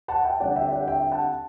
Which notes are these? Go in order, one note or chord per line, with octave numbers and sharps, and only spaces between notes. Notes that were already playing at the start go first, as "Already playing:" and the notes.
F#5 A5
E5 G5
D3 G3 C4 D5 F#5
E5 G5
D5 F#5
E5 G5
F#5 A5